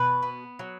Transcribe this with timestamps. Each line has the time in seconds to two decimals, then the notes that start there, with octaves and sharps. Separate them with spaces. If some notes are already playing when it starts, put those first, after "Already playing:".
Already playing: B2 B4
0.22 B3
0.59 F#3